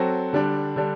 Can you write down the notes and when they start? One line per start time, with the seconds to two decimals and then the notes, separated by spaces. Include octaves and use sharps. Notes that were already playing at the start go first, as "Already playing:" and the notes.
Already playing: F#3 C4 F#4 A4
0.33 D3 G3 D4
0.76 D3 G3 D4